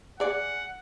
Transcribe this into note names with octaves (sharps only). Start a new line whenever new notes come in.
G#4 D5 F#5